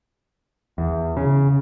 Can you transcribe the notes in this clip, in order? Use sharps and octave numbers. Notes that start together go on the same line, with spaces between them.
E2
C#3